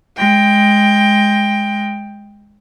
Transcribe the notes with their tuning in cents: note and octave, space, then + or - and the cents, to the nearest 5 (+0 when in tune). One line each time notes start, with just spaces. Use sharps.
G#3 +0 G5 +10